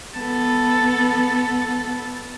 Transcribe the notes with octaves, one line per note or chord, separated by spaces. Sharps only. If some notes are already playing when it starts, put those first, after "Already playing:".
B3 A4